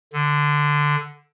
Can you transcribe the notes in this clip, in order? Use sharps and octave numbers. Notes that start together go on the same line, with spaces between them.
D3